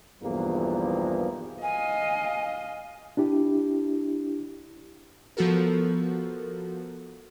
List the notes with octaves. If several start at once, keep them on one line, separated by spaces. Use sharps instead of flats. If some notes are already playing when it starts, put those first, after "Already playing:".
B1 E2 G2 E3 F3 A#3
D#5 F5 G#5
D4 E4 G4
F3 B3 F#4 A4 A#4